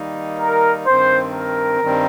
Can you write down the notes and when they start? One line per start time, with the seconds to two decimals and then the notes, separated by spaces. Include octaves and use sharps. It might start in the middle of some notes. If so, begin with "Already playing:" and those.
Already playing: D#3 G3 A#3 D#4
0.39 A#4
0.86 G2 D#3 C4 C5
1.33 A#4
1.81 G2 D#3 G3 C4